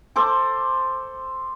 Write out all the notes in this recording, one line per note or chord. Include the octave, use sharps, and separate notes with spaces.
A4 C5 D6